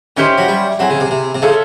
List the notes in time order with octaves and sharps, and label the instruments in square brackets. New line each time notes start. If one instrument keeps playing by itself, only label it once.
[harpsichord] D#3 [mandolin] C#4 E4 G4 C5
[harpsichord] F#3
G3
[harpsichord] F#3 [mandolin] C4 E4 G#4
[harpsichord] C#3
C3
C3
C3
[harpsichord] C#3 [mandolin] F4 A4 C#5 E5